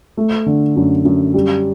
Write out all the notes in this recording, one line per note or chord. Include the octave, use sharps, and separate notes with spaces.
A3
D3
F#2
F#2
G3